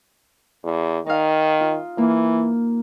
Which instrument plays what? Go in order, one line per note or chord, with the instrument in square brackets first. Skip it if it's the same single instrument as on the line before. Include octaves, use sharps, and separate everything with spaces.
[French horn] E2
[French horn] D#3 [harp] D#4 F5
[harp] F4
[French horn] E3 [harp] A#3